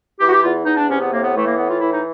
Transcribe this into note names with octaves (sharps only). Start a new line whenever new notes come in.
E3 G4
F#4
G4
E2 F4
E2 D#4
D4
C3 C#4
B3
A2 A#3
B3
E3 A3
A#3
A2 B3
F4
E3 E4
D#4